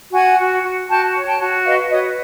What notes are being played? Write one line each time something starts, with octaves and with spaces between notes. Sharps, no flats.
F#4 F#5 G#5
F#4
F#4
F#4 G5 A5
C#5
G5 A5
F#4
B4 D#5 F5
F#4 C#5 D#5